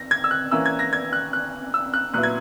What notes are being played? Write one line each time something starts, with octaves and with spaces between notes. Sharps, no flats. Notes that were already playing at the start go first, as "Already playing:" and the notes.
Already playing: A#6
G#6
E6
F#6
E3 A#3 C#4 E4 E6
G#6
A#6
G#6
F#6
F#6
E6
F#6
A#2 F#3 B3 E4 F#6
G#6